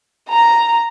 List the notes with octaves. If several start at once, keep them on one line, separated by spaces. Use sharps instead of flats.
A#5